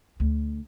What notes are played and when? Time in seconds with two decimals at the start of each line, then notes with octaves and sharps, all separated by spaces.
0.20 D2